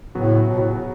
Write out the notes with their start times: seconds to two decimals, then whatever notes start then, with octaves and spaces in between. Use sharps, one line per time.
0.15 A2 C#3 F#3 B3 F#4
0.50 B2
0.58 A2